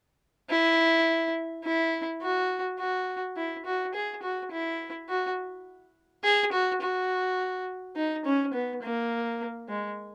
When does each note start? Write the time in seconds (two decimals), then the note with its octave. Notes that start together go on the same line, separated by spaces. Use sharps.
0.50 E4
1.64 E4
2.22 F#4
2.79 F#4
3.36 E4
3.65 F#4
3.94 G#4
4.23 F#4
4.52 E4
5.09 F#4
6.24 G#4
6.52 F#4
6.81 F#4
7.96 D#4
8.25 C#4
8.53 B3
8.82 A#3
9.68 G#3